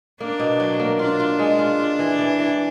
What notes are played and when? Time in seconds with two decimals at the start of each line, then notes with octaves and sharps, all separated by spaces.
0.20 A#3 D4
0.40 B2
0.60 F#3
0.80 A#3
0.99 D4 F4
1.20 F4
1.39 G#3
1.59 F4
1.79 F4
1.99 E3
2.19 E3
2.39 E3